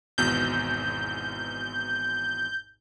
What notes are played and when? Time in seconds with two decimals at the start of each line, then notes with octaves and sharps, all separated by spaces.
0.18 G#1 E2 B2 G6